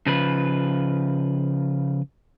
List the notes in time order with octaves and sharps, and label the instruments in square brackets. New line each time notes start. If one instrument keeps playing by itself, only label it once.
[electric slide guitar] C#3 F3 B4